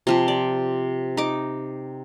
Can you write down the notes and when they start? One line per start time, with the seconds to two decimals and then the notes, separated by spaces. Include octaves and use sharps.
0.07 C3 F3 G4
0.28 D5
1.17 D#4 D6